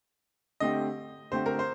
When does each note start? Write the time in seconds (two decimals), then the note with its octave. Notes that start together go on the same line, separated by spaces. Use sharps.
0.60 D3 A3 C4 G4 D#5
1.32 D3 A3 C4 G4 C5
1.46 A#4
1.59 C5